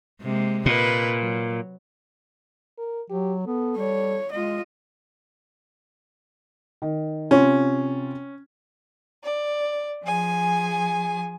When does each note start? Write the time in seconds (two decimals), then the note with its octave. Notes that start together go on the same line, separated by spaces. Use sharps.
0.21 C3 G#3 A#3
0.66 A#2 B4 D#5
1.18 F#3
2.78 A#4
3.10 F#3 G4
3.47 B3 A4
3.77 G3 C#5
4.31 G#3 F4 D#5
6.82 D#3
7.31 C3 C#4 F4
9.23 D5
10.04 F3 G#4 G#5